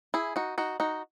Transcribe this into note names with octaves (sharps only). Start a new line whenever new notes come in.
E4 G#4
D#4 F#4
D#4 F#4
D#4 F#4